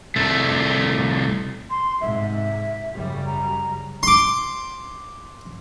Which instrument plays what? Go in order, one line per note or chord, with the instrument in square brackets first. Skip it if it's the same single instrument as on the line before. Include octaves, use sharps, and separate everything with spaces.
[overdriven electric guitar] C2 A3
[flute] C6
[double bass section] G#2 C3 [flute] E5
[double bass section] F#2 C#3 G3
[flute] A#5
[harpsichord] C6 D6